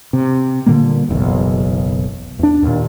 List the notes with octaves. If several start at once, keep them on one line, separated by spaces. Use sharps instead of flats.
C3
A#2 D3 G3 A#3
F#1 B1 E2
E2 D4
D#2 A#2